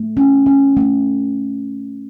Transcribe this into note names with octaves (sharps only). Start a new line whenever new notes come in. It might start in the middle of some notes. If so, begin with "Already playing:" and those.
Already playing: A3
C#4
C#4
A3